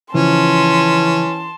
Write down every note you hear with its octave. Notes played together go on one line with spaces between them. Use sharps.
C#3 E3 F3 C#4 A5 C6